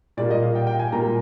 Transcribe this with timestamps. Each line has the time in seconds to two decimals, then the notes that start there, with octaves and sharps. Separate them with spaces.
0.17 A#2 G3 A#3 D5
0.30 D#5
0.42 F5
0.55 G5
0.67 G5
0.79 G#5
0.92 A#2 G3 A#3 A#5